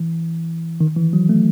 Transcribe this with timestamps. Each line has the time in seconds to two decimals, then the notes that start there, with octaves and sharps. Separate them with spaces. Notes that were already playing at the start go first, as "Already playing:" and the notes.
Already playing: E3
0.81 D#3
0.97 E3
1.13 F#3
1.29 A3